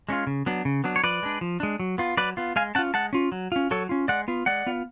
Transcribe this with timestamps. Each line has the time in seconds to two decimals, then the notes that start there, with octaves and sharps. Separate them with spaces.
0.09 G#3 C#4 F4
0.27 C#3
0.46 F#3 B3 D4
0.65 C#3
0.84 F#3 B3 D4
0.96 C#5
1.04 F3 B4 D5
1.23 G#3 D4
1.41 F3
1.60 G#3 D4
1.80 F#3
1.98 B3 F4
2.17 F#3 B4 D5
2.37 B3 F4
2.56 G#3 F5 G#5
2.75 C#4 F#5 A5
2.78 F4
2.94 G#3 F#5 A5
3.13 C#4 F4
3.32 F#3
3.52 C#4 F4
3.71 F#3 A4 C#5
3.89 C#4 F4
4.08 G#3 D5 F#5
4.28 B3 F4
4.46 G#3 D5 F#5
4.66 B3 F4